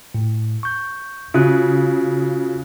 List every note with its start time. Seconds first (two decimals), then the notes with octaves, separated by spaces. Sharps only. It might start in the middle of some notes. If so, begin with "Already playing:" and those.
0.15 A2
0.63 C#6 G6
1.34 C#3 F4 F#4 F#6